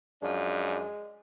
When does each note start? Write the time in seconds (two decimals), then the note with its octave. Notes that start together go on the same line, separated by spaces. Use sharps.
0.22 F#2 F3 G#3 D4